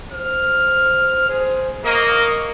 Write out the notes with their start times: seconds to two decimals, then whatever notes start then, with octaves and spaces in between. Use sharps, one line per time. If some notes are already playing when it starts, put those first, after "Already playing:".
0.12 C5 F6
1.29 G#4 C5
1.85 A#3 A#4 D#5 C#6